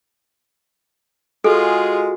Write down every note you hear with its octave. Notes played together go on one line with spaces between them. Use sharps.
G#3 F4 F#4 G#4 A4